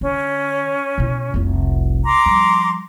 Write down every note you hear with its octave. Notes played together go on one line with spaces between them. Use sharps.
D3 C#4
B2 E4
F1 C2
A#5 C6 D6
F3 G3